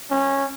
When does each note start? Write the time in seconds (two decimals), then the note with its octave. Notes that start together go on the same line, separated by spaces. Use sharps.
0.10 C#4